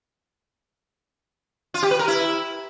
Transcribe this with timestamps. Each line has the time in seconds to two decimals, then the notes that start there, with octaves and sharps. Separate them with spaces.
1.74 F4
1.83 G4
1.91 B4
1.99 A#4
2.08 E4